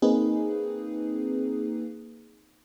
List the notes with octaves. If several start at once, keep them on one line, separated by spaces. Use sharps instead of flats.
A#3 C4 D#4 G#4 B4